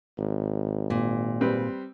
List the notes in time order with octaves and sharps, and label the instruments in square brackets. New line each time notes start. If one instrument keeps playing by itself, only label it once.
[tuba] G#1
[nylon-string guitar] A#2
[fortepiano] G3 C4 B4